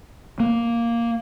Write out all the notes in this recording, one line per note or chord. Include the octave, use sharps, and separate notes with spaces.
A#3